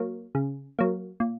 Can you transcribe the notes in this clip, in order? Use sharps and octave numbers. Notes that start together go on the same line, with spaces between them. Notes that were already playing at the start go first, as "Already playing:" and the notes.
Already playing: F#3 A#3
C#3
F#3 A#3
A#2